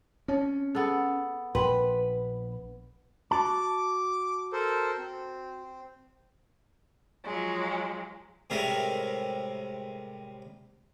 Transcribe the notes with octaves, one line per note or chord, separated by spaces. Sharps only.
C4 C#4 C#5
B3 G#4 A4
A#1 B4 G5 C6
F#4 A5 D6
A4 A#4 C5
C4
F3 F#3 G#3
A2 C3 G3 G#3 A#4 E5